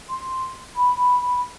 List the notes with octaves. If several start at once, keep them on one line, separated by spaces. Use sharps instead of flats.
C6
B5